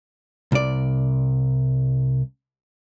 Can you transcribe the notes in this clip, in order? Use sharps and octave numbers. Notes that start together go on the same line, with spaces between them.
C2 D5